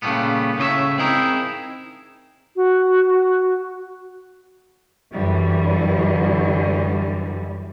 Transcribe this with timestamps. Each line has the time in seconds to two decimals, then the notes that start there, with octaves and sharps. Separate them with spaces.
0.02 A#2 C#3 E3 G3 A3 B3
0.58 A2 C#3 C#5 D#5 E5
0.98 C4 D#4 E4 G#4 A#4
2.56 F#4
5.12 F#2 D3 E3 G3